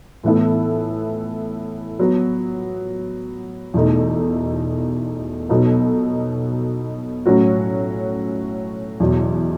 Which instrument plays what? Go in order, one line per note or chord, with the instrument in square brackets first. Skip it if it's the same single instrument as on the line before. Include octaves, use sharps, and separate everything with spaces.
[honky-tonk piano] A2 E3 B3 E4 A4
F#3 B3 F#4
E2 B2 A3 D#4 A4
B2 F#3 B3 D#4 A4
A2 F#3 C#4 F#4
E2 B2 F#3